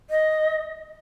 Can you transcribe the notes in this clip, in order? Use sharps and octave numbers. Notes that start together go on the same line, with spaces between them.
D#5